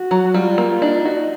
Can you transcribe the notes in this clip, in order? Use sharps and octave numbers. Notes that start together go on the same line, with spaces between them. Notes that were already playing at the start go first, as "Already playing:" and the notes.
Already playing: F#4
F#3
G3 F4
A#3
D4 D#4
F#4